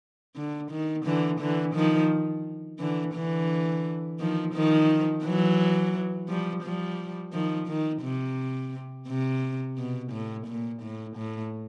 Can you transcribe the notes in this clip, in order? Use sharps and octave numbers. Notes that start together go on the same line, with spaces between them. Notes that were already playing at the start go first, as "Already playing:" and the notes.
D3
D#3
D3 E3
D3 E3
D#3 F3
D3 E3
D3 E3
D#3 F3
D#3 F3
E3 F#3
F3 G3
F3 G3
D#3 F3
D#3
C3
C3
B2
A2
A#2
A2
A2